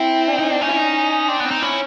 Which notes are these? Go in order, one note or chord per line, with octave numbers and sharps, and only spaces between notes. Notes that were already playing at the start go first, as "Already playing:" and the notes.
Already playing: C4 E4
D4
D#4
D4
C#4 D#4
E4
D#4
C4 D4
B3
C4
D#4
C#4 E4